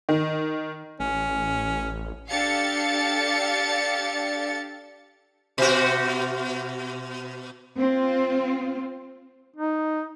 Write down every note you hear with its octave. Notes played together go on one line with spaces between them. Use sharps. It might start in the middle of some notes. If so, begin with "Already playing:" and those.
D#3
A1 C#4
D4 G4 A4 F5 A6 C#7
B2 F#4
C4 F4
D#4